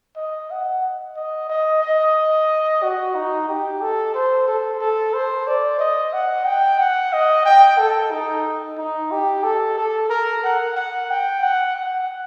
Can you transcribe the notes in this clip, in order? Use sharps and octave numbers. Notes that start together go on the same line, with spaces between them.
D#5
F#5
D#5
D#5
D#5
F#4
D#4
G4
A4
C5
A4
A4
C5
D5
D#5
F#5
G5
F#5
D#5
G5
A4
D#4
D#4
G4
A4
A4
A#4
F#5
F#5
G5
F#5
F#5